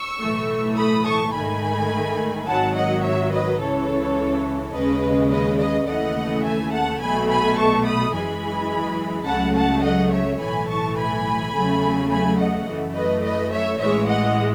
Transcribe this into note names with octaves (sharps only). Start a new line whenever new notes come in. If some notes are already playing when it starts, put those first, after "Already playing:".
Already playing: C#6 E6
B1 A2 E3 A3
B5 D#6
A5 C#6
G#2 D#3 A3 G#5 B5
G#1 G#2 D#3 F#3 F#5 A5
D#5 F#5
C#5 E5
B4 D#5
C#2 C#3 E3 A4 C#5
D#2 C#3 G#3 B4 D#5
B4 D#5
B4 D#5
D#2 C#3 E3 A3 D#5 F#5
E5 G#5
F#5 A5
B1 B2 A3 G#5 B5
G#5 B5
A5 C#6
B5 D#6
F#2 E3 G#3 G#5 B5
C#2 C#3 F#3 A3 F#5 A5
F#5 A5
D#5 F#5
C#5 E5
B1 A2 E3 A3 G#5 B5
A5 C#6
G#5 B5
E2 C#3 F#3 A3
G#5 B5
D#5 F#5
F#2 E3 A3
B4 D#5
B4 D#5
C#5 E5
A1 A2 E3 G#3 C#5 E5
D#5 F#5